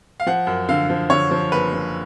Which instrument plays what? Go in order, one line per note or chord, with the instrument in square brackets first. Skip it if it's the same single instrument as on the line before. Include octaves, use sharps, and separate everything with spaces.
[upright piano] F5
F3 F#5
F#2
D3 F5
F3
D3 C#5
F3
F#1 B4
F3